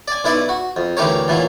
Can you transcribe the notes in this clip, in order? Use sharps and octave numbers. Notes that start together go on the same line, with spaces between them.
D5 G#5
B1 E4 B4 D5
F#4
F2
D2 E3 G4 A#4 C#5
A#2 E3 F#3